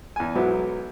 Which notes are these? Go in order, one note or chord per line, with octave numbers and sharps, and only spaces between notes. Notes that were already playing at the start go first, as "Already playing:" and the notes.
E2 G#5
B1 G#2 F#3 B3 E4 D6